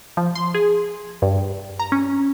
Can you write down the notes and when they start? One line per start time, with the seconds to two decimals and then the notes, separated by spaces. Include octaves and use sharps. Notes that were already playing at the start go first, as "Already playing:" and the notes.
0.17 F3
0.35 C6
0.54 G#4
1.22 G2
1.79 A#5
1.92 C#4